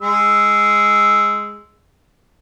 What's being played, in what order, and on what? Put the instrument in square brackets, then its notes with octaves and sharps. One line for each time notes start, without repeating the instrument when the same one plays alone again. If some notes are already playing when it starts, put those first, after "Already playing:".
[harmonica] G#3 E6